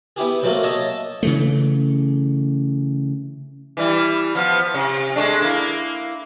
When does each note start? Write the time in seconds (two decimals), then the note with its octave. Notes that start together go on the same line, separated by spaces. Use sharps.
0.16 B3 E4 G4 G#4
0.42 C3 F#3 A3 A#3
0.63 C#5 D#5 E5 A5
1.23 C#3 E3 A3
3.77 E3 G3 E4
4.35 F3 B3
4.74 C3
5.16 G#3 A3 D4
5.42 A#3 E4